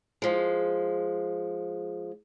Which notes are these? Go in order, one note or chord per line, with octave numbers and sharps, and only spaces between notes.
F3 G#3